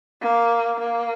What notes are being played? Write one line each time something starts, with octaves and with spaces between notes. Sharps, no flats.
A#3
A#3